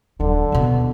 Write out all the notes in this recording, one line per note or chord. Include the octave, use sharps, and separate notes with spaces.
D#1 D3 F#3
D#2 B2